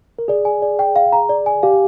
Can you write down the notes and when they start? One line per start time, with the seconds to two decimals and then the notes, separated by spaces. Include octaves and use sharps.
0.19 A#4
0.28 G#4 D5
0.45 G#5
0.62 D5
0.79 G5
0.96 F5
1.12 A#5
1.29 D5
1.46 G#5
1.63 G4 F5